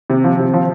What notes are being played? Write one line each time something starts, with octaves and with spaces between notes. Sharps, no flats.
C3
F3
C3
F3